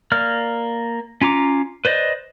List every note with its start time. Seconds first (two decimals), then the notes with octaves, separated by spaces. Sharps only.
0.12 A#3 D5 F6
1.21 C#4 F4 A#5 D6
1.85 B4 C5 D5 D#5